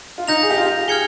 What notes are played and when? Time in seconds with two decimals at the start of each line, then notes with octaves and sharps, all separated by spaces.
0.18 F4
0.27 D#4 G6 A#6 F7
0.43 G#4
0.50 G4
0.58 F4
0.65 G4
0.88 G#4 F6 G#6 C#7 G7